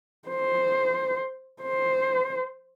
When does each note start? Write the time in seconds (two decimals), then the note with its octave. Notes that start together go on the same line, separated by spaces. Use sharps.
0.29 C5
1.62 C5